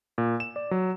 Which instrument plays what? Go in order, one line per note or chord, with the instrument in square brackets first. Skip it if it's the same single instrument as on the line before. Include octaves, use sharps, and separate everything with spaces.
[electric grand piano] A#2
E7
D5
F#3